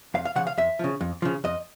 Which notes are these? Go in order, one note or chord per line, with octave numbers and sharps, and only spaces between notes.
F2 F5
F5
C#3 F3 F#5
F5
F2 E5
C#3 F3
F2
C#3 F3
F2 D#5